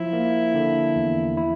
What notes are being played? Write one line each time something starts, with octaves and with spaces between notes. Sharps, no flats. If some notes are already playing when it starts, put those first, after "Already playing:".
Already playing: F3 E4
A#3
D3
E2
E4